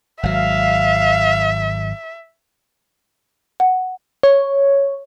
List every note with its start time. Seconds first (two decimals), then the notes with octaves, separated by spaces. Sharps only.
0.23 G#1 F#3 E5 F5
3.60 F#5
4.23 C#5